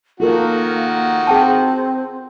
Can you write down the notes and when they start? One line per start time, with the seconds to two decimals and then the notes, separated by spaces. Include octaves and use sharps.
0.20 D#3 A#3 F4 F#4 A4 A#4 F#5
1.27 C4 G#4 G5 A5